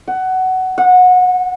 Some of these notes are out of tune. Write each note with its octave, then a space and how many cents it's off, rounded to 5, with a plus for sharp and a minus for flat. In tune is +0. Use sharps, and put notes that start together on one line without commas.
F#5 +15
F#5 -25